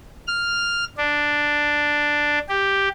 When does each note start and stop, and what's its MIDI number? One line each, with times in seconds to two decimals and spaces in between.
0.27 0.84 89
0.98 2.39 62
2.49 2.89 67